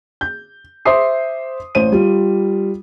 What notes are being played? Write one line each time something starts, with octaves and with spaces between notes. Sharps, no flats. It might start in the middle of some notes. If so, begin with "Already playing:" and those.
G6
C5 E5 C6 D6 D#6 C7
A1 C5 D#7
G3 F4